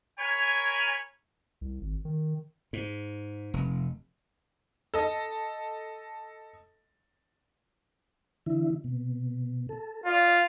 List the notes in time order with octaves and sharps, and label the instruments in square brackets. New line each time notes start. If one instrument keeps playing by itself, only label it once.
[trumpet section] A#4 C#5 G#5 B5
[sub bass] C2
G#1
D#3
[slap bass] G#2
F1
[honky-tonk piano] A4 D#5
[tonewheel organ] D3 E3 E4
B2
A4
[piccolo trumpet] F4 [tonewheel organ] D5